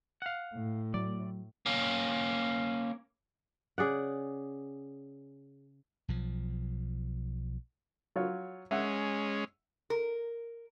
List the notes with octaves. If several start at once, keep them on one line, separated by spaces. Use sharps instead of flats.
F5 F#5
A2
F#3 D5
A#3 C#4
C#3 G#4 D5 F#5
B1 F3
F#3 F4 C#5
G#3 C#4 E5 F#5
A#4